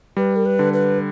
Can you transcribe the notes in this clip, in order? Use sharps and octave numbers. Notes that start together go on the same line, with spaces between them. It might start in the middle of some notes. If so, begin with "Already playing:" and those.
G3 B4
A#4
B4
D3
B4